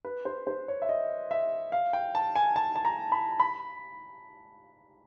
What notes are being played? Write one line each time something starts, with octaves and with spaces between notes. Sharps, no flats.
B4
C5
C5
C#5
E5
D#5
E5
F5
G5
A5
G#5
A5
A5
A#5
B5
B5